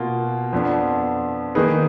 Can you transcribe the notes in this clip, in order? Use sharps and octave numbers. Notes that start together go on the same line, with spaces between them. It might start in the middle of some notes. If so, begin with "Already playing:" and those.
Already playing: B2 A#3 F4
F2 F3 B3 D4
D#3 A#3 D#4 G#4 B4